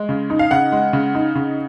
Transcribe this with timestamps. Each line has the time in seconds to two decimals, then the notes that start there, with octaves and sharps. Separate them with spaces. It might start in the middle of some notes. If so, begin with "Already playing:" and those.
Already playing: G#3
0.09 C#3
0.30 D#4
0.39 F5
0.51 C#3 F#5
0.72 G#3
0.93 C#3
1.15 D#4
1.35 C#3